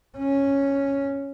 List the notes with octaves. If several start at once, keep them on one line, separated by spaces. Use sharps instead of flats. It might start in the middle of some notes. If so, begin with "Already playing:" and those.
C#4